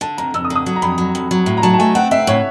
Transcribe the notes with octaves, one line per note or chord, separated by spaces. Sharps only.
D3 A5
F2 A#5
F2 E6
D#6
D3
D#6
F#3
A#5
F2 B5
F#3
F2
F#3
A2
A#5
F#3 A5
A5
A3 G#5
C4 F#5
C4 E5
A2 C#5